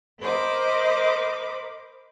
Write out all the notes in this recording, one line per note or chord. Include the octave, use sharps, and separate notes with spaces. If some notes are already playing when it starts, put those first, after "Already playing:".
A#4 C5 D#5 B5 D6